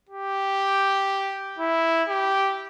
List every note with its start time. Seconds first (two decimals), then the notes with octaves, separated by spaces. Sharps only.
0.09 G4
1.59 E4
2.09 G4